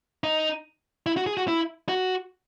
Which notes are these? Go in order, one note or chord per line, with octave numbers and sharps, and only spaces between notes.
D#4
E4
F#4
G#4
F#4
E4
F#4